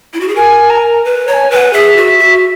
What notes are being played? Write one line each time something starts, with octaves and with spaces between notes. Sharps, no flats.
E4
F#4
G#4
A#4 G#5
A#5
B4
C#5 A#5
G#5
B4 F#5 G#5
G#4 E5
F#4
F#4